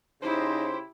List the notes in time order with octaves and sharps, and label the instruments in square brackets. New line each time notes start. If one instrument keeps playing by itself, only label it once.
[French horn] C#3 [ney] D#4 [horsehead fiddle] E4 G4 [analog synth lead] C5